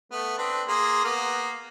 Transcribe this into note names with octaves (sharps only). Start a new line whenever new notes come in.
A3 B3
C4 D4 B4
A#3 G#4 C6
A#3 B3